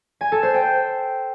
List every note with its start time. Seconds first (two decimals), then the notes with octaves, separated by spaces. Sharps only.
0.21 G#5
0.32 A4
0.43 C5
0.54 G5